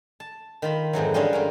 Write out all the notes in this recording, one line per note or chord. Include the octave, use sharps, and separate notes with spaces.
A5
D#3 F4 B5
F2 G#2 E3 F#3
D3 G3 G#3 C#4 F4 D#5
G2 C#4 A#4